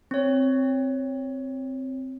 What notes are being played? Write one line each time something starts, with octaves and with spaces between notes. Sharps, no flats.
C4 C#5